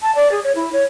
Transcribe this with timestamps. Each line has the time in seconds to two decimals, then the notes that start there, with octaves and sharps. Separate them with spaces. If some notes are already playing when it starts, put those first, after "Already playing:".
0.02 A5
0.15 D5
0.31 G#4
0.44 C#5
0.55 E4
0.73 C#5